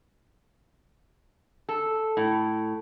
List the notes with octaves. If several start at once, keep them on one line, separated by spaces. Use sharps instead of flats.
A4
A2